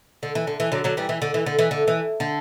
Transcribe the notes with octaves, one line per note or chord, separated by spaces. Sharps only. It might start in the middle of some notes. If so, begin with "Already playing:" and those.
D3
E3
D3
E3
D3 F#3
D3 F#3
E3 G3
E3
D3
E3
D3
E3
D3
E3
D3